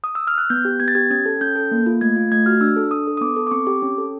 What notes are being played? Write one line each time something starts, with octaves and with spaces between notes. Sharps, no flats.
D#6
E6
F6
F#6
B3 G6
G4
B3 G#6
A6
G4 G#6
C#4 G#6
A4
C#4 G6
A4
A#3
F4
A3 G#6
F4
A3 G#6
F#4 F6
D4 E6
A4
D4 D#6
A4
D#6
B3 D6
A4
D6
C4 C#6
G4 D6
C#4
A4